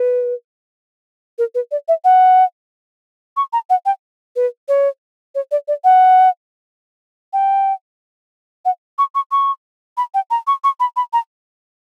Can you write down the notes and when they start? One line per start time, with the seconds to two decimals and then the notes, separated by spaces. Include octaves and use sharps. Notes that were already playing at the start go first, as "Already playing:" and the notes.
Already playing: B4
1.38 A#4
1.55 B4
1.71 D5
1.88 E5
2.04 F#5
3.37 C#6
3.53 A#5
3.70 F#5
3.86 G5
4.36 B4
4.68 C#5
5.35 C#5
5.51 D5
5.68 D5
5.84 F#5
7.33 G5
8.65 F#5
8.98 C#6
9.15 C#6
9.31 C#6
9.97 B5
10.14 G5
10.31 A#5
10.47 C#6
10.64 C#6
10.80 B5
10.96 B5
11.13 A#5